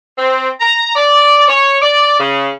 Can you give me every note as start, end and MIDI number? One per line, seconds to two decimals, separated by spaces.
0.18 0.48 60
0.60 0.94 82
0.96 1.45 74
1.48 1.78 73
1.82 2.18 74
2.20 2.50 49